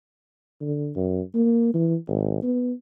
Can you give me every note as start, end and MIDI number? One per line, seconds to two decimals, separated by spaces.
0.61 0.91 50
0.96 1.21 42
1.34 1.72 58
1.74 1.95 52
2.08 2.41 32
2.43 2.73 59